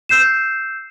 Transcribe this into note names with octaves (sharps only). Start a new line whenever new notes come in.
E6 G6 C7 E7